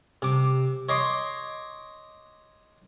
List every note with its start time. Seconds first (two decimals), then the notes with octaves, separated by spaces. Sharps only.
0.22 C3 D6
0.89 C#5 D#5 C6 D6